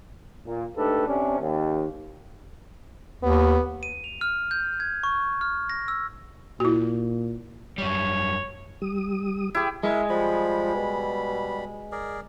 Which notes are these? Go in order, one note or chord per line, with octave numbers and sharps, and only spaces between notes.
A#2
G#2 A3 D4 G4 A4 B4
C3 C#4 D4
D#2
D#2 B3
D#7
F7
F6
G6
G#6
C#6
F6
A#6
E6
A#2 E4 F#4
F#2 G3 C#5
G3 D#6
E4 G4 G#4
G#3 E4 A#4 E5
F3 G3 B5
B2
G#4 A#4 D5